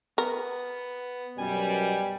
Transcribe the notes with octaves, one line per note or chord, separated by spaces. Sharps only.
B3 A#4
F#2 B2 G3 G#5